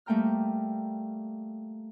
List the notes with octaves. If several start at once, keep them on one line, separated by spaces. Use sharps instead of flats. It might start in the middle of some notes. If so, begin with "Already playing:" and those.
G3 A3 A#3 G5 A#5 F6